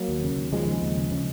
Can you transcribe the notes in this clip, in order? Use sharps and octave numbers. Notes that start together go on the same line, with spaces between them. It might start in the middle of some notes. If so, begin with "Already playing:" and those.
Already playing: F#3 A#3
D#2
C#3
D#2
D#2 F3 G#3
C#3
D#2
C#3
C#3